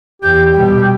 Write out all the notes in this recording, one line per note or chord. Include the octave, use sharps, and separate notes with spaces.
E2 G4 G6
B2 G3 G5